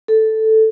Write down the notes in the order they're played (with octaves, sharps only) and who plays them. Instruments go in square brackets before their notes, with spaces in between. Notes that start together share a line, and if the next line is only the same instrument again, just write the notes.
[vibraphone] A4